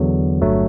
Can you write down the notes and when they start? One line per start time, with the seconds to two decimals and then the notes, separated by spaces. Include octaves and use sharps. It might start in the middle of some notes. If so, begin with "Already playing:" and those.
Already playing: E2 D3 F#3
0.41 G1 G2 F#3 A3